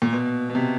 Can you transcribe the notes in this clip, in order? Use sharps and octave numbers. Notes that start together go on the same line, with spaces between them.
A#2
B2
B2
C3